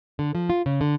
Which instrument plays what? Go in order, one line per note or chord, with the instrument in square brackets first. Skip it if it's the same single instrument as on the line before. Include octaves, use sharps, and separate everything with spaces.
[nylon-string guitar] D3
F3
F4
C#3
D3